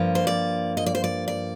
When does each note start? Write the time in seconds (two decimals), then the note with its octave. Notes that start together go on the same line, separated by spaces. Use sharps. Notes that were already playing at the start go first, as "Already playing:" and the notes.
Already playing: G2 F3 A#3
0.15 C5
0.27 D5
0.77 D#5
0.86 D5
0.95 C5
1.04 D5
1.28 D5